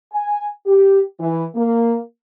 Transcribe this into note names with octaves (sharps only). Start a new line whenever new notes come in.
G#5
G4
E3
A#3